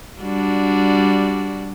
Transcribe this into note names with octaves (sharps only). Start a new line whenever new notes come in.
G3 D4 F#4